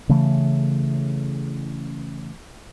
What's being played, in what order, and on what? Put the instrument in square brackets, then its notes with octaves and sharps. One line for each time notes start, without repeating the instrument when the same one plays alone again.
[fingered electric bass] C#3 E3 A3